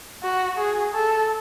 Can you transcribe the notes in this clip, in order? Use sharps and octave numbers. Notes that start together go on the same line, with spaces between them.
F#4
G#4
A4